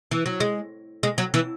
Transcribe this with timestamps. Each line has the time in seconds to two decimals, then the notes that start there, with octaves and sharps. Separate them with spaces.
0.11 E3
0.26 F#3
0.40 G#3
1.03 G#3
1.18 F#3
1.34 E3